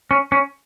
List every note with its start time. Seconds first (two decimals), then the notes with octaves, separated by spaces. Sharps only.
0.11 C#4
0.32 C#4